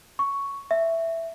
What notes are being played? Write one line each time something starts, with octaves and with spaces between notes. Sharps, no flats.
C#6
E5